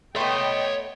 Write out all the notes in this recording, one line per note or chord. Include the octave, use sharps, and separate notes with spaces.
A3 B3 C#5 D#5 G5 C6